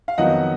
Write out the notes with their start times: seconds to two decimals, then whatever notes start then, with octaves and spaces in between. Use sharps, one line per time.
0.08 F5
0.18 F2 D#3 F#3 B3 D#5 F#5